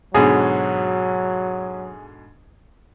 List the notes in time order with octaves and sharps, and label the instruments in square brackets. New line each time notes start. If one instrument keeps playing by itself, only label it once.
[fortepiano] G#2 B2 D3 [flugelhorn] F#3 [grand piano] G#4